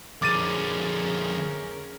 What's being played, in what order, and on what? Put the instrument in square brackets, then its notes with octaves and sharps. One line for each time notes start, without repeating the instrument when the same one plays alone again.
[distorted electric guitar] F2 D3 [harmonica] C#4 A#4 [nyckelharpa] G#4 [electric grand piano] D6 A6 D#7